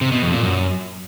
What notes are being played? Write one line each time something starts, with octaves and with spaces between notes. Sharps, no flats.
C3
B2
F2
A#2
F#2